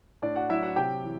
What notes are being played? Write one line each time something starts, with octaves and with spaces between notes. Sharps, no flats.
A2 D4 D5
F#4 F#5
F#3 E4 E5
F#4 F#5
C3 G4 G5
E3